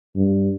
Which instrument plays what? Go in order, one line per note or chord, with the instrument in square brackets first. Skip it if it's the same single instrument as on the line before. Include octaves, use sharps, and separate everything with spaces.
[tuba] G2